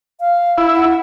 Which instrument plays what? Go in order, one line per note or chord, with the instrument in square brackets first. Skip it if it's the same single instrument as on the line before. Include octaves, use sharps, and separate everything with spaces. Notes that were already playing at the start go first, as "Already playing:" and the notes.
[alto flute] F5
[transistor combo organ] E4
[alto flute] F#5